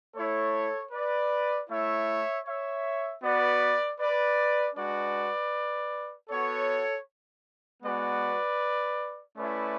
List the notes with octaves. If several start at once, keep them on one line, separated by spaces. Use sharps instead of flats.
A3 E4 A4 C#5
B4 D5
A3 E4 C#5 E5
C#5 E5
B3 F#4 B4 D5
B4 D5
G#3 D4 F#4 B4 D5
B3 F#4 A4 C#5
G#3 B3 F#4 B4 D5
A3 C#4 E4 B4 D5